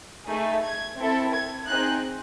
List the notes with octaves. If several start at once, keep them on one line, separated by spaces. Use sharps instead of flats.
A3 D#4 G#4
G#6
C4 E4 A4
G#6
C4 D#4 G#4 F#6